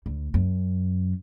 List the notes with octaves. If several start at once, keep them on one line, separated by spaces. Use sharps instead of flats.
D2
F#2